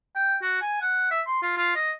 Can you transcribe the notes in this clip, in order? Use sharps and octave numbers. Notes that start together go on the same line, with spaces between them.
G5
F#4
G#5
F#5
E5
C6
F4
F4
D#5